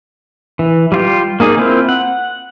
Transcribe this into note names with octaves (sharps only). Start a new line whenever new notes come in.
E3
G3 F4 G4
A#3 D#4 G#4 D5
A#3 C4 E4 F4
F#5